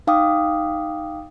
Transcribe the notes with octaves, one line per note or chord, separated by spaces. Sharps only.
D#4 F5 G5 D6 D#6